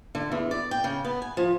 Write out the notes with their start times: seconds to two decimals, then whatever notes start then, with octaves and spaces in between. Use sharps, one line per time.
0.15 D3
0.32 E2
0.51 D5
0.71 G5
0.84 C#3
1.04 B3
1.22 G#5
1.37 F3